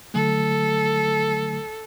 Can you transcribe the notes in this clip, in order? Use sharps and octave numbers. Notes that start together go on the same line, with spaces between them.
D3 F#3 A3 A4